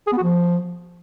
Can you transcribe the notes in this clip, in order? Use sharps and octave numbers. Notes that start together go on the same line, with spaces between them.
G#4
B3
F#4
F3